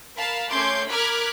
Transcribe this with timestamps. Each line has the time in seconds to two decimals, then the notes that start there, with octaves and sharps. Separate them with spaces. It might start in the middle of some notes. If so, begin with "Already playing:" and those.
0.16 A#4 F5 A5 B5
0.50 A3 C#4 C6 D6 G6 G#6
0.89 A#4 B5 D6 F6 F#6 G#6